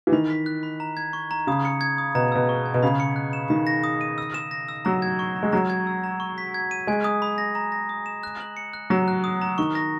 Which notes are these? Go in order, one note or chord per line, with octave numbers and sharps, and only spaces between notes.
E3
D#3 B5
B6
F#6
B5
A#5
G#6
C#6
A#5
C#3 D#6
C#7
G#6
D#6
B2 A#5
B2 E6
C#6
G#6
B2
C#3 B5
C#7
F#6
E7
D#3 B5
A#6
D#6
D#7
E6
E7
A#6
E6
F#3 A#5
G#6
C#6
A#5
G#3
F#3 A#5
G#6
E6
A#5
C#6
B6
G#6
D#7
G#3 G#5
D#6
B5
A#6
A#5
A#6
D#6
E7
F#6
F#7
C#7
F#6
F#3 A#5
F#6
D#6
A#5
D#3 C#6
A#6